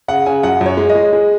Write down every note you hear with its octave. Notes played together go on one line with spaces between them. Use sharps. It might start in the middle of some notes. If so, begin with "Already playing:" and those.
C#3 F#5
C#3 G#5
F#2 F#5
F#2 C#5
G#3
D#5
G#3
G#3